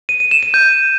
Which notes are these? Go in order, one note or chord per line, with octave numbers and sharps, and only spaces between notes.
D#7
D#7
E7
D#7
G6